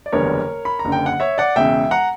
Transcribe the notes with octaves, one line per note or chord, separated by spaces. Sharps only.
D5
F#1 E2 D3 G3 B3 A#4 C#5
B5
A#5
F#1 F#2 D3
G5
F#5
C#5 E5
D5 F#5
E1 E2 C#3 E5 G5
F#5 A#5